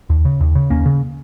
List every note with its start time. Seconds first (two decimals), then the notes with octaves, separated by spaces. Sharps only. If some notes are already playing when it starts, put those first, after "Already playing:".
0.10 D#2
0.25 C#3
0.40 D#2
0.55 C#3
0.70 D#2 A#3 C#4
0.86 C#3